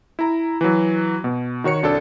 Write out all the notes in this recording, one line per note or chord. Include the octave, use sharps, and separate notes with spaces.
E4 A#5
E3 F#3
B2
D#3 F#4 C#5 C#7
C2 D4 A4